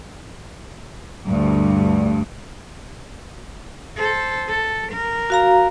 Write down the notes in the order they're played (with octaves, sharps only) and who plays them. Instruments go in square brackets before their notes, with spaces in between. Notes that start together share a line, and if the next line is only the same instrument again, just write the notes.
[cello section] D2 G2
[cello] A4 C5
A4
A#4
[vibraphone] F#4 F5 A#5